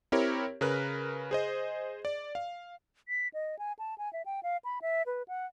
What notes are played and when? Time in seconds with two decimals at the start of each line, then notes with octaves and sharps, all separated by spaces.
0.12 C4 E4 G4 A#4 C#5
0.61 C#3 A#4 B4 F#6
1.31 G#4 C5 D#5
2.05 D5
2.35 F5
3.08 B6
3.34 D#5
3.59 G#5
3.79 A5
3.98 G#5
4.13 E5
4.26 G5
4.43 F5
4.65 B5
4.82 E5
5.06 B4
5.28 F#5